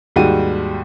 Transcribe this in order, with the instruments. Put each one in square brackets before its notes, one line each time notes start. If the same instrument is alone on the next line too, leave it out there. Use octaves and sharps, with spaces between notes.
[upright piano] D#2 G#2 G3 F#4 D#7